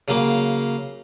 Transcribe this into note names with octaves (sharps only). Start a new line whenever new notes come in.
C#3 F#3 A#3